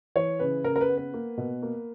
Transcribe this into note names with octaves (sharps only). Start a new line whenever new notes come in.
E3 C#5
C#3 B4
C#3 A#4
A#4
B4
B3
B4
A#3
B2
A#3